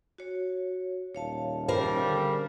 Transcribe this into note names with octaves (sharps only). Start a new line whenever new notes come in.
F#4 C#5
D#1 C#5 F5 A5
C#3 G3 A#4 C5
D3